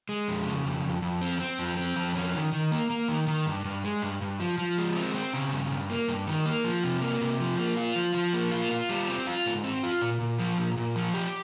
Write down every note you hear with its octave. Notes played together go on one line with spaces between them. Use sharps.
G#3
F2
C#3
F2
F2
F2
C4
C4
F2
C4
F2
C#4
D#3
D#3
A#3
A#3
D#3
D#3
G2
G2
G#3
G2
G2
F3
F3
G#3
C4
C4
C#3
G2
G2
A#3
G2
D#3
A#3
F3
C3
A#3
C3
F3
A#3
F4
F3
F3
A#3
F4
F4
G3
C4
F4
G#2
C4
F4
A#2
A#2
F3
A#2
A#2
F3
G4